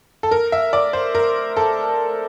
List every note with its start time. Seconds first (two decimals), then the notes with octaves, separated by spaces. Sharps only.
0.23 A4
0.31 A#4
0.52 E5
0.73 D5
0.93 C5
1.15 A#4
1.57 A4